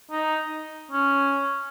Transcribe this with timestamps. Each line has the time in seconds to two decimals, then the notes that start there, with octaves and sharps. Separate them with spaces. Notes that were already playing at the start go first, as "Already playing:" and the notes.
0.11 D#4
0.91 C#4